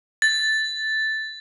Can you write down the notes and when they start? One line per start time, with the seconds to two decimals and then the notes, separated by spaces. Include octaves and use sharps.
0.22 A6